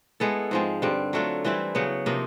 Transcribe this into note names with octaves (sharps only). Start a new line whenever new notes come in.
G#3 B3 E4 A4
G#2 F3 G#3 C4
G2 D3 G3 C4
F#3 A3 D4 F4
E3 G3 C4 E4
C#3 F#3 B3
C3 F3 A#3 D#4